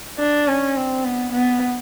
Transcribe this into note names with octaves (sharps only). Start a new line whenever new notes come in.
D4
C#4
C4
B3
B3